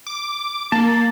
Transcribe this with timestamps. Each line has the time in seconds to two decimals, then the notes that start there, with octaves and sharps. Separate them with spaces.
0.07 D6
0.72 A#3 A5